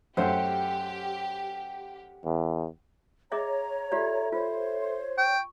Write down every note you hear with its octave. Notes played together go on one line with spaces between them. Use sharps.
F#2 A3 G4 C5 F#5 G5
E2
G#4 C#5 D#5 E5 A#5
F4 G4 A4 D5 E5
F4 C5 C#5
G5 C#6